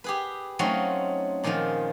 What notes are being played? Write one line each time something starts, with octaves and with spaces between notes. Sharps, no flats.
G4 G#4 B4
F#3 A3 C4 C#4 D#4 F4
A#2 D#3 F3 G#3 F4